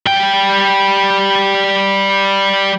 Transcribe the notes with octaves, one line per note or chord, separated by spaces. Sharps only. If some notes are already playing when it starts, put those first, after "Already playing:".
G3 G5